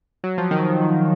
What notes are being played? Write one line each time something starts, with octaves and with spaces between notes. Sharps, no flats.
F#3
F3
D#3